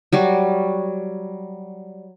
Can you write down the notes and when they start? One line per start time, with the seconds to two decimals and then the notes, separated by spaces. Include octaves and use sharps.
0.13 F#3 G3 F#4